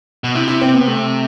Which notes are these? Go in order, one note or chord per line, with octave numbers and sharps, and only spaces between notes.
B2
C3 E4
E4
C4
B3
A3